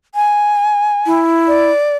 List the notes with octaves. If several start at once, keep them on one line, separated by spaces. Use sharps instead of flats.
G#5
E4
D5